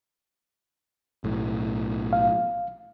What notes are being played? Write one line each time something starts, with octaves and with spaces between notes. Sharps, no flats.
B1 A2
F5